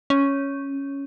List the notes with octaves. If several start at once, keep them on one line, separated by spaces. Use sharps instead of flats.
C#4